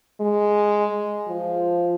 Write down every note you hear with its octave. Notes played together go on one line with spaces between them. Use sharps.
G#3
F3